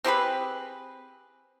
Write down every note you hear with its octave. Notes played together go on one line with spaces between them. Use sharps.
C4 G4 G#4 B4